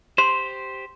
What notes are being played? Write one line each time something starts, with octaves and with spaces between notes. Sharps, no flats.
G4 C5 C6